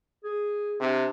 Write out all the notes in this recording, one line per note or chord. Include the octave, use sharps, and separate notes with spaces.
G#4
C3 D4